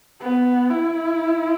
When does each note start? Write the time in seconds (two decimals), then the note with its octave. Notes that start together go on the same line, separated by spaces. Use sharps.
0.22 B3
0.70 E4